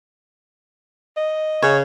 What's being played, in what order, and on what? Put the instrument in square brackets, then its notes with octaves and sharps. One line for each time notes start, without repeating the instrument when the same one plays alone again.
[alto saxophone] D#5
[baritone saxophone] C#3 [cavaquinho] C#5